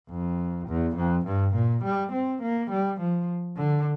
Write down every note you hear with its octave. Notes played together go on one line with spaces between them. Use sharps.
F2
E2
F2
G2
A#2
G3
C4
A#3
G3
F3
D3